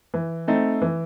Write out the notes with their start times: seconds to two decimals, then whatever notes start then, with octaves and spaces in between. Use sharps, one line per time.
0.14 E3
0.48 A3 C4 D#4
0.82 E3